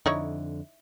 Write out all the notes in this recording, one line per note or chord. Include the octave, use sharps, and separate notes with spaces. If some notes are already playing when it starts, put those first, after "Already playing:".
F2 D3 D#4 E4 C#5